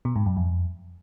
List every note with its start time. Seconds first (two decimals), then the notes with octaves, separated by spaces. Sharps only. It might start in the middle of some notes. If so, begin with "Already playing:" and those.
0.05 B2
0.16 G#2
0.26 F#2
0.37 F2